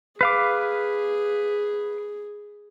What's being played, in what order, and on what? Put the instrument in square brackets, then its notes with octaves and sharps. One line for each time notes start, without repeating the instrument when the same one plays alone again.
[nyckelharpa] G#4 [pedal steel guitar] B4 F5 D6